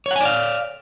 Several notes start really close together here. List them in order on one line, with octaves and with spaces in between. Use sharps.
C#5 F#5 G#5 D5 F5